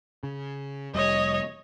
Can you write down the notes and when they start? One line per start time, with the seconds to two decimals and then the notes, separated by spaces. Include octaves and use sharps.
0.23 C#3
0.94 F1 G3 C#5 D#5